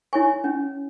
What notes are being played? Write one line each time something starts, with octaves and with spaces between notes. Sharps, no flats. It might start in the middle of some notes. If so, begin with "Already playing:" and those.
E4 C#5 G#5 C#6
C#4